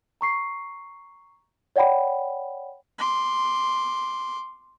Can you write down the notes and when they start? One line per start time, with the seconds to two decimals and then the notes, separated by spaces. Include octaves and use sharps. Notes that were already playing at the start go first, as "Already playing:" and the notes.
0.21 A#5 C#6 C7
1.76 C#5 D5 F#5 G5 B5
2.99 C6 D6